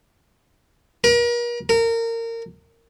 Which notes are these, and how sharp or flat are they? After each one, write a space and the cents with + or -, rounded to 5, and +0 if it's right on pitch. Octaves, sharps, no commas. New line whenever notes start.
A#4 +40
A#4 -25